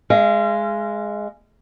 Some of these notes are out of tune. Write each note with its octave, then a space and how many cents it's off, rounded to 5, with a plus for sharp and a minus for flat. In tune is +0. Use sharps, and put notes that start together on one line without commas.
G#3 +0 F5 -40